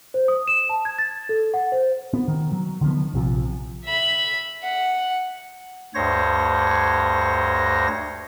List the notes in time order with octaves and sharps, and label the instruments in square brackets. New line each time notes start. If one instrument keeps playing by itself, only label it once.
[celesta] C5
D#6
E7
A5
G#6
A6
A4
F#5
C5
[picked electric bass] B3
D#3
F#3
D3 D#3 F3 B3
A#1 C3 F3
[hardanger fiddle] E5 B5
F#5
[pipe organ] D2 G2 C5 C#5 A#6